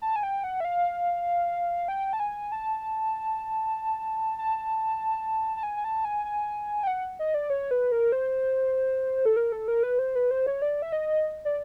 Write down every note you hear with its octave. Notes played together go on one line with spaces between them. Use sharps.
A5
G#5
G5
F#5
E5
F5
G5
A5
G#5
A5
A5
A5
G#5
G#5
A5
G#5
G#5
G5
F#5
D#5
D5
C#5
B4
A#4
C5
A4
A#4
A4
A#4
B4
C5
B4
C5
C#5
D5
E5
D#5
D5